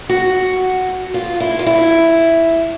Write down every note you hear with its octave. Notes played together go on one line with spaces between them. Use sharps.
F#4
F4
E4
F4
E4